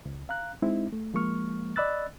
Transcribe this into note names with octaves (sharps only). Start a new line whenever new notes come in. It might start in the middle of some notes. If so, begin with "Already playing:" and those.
C#2
F5 A#5 F#6
G#3 C4 D#4 E4
A3
F3 G#3 A#3 C#6 F6
D5 D#5 B5 E6 F#6 A6